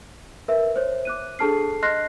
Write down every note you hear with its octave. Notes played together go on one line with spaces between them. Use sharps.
A#4 B4 E5
C5 C#5
D6 F#6 D#7
D4 G#4 A4 A5 F6 C7
D#5 C6 F6 F#6 A#6 C7